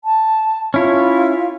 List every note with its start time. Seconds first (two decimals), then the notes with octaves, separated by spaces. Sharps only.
0.04 A5
0.74 C#4 E4 F4 C#5